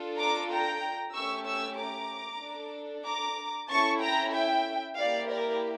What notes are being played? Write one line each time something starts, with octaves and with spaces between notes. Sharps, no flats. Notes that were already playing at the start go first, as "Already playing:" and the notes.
Already playing: D4 F4 A4
A#5 D6
G5 A#5
A3 C#4 G4 C#6 E6
C#6 E6
A#5 D6
D4 A4
A#5 D6
C#4 E4 A4 A5 C#6
G5 A#5
E5 G5
A#3 E4 G4 D5 F5
A#4 D5